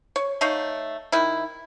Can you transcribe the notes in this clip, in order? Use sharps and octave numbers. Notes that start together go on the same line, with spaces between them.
C#5
A3 D#4 C#5 F5
D#3 E4